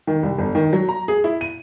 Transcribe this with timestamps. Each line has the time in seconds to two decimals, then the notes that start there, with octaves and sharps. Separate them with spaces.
0.07 D#3
0.23 C2
0.38 G1
0.55 D#3
0.73 F#3
0.89 A#5
1.08 G#4
1.24 E4
1.41 D#7